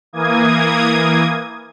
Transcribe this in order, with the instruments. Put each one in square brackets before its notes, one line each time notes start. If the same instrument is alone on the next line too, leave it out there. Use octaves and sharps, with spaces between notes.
[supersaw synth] E3 A#3 D#6 G#6